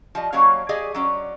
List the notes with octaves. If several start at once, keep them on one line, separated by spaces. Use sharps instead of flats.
F3 G3 D#5
F#3 G3 A#3 C#4 C#5 F5
G4 G#4 D5 D#5 F5 G#5
F#3 C#4 D5